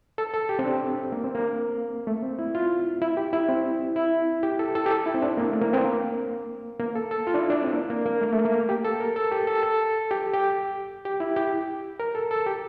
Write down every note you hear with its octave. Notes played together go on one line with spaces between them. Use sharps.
A4
A4
G4
C4
D4
A#3
C4
A#3
A3
C4
E4
F4
E4
G4
E4
C4
E4
G4
A4
A4
G4
A4
E4
C4
D4
A#3
A3
A#3
C4
A#3
A#3
A4
A4
F4
D4
E4
D4
C4
A#3
A#3
A#3
A3
A3
A#3
G4
A4
A#4
A4
G4
A4
A4
G4
G4
G4
E4
G4
A#4
A4
A4
G4